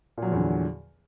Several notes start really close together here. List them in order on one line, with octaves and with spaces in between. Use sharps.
A#2 F#3 F3 E2 D3